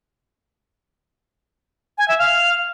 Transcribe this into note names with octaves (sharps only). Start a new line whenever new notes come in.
G#5
E5
F5